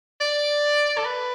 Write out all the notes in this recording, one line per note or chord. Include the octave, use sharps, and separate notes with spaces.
D5
A4
B4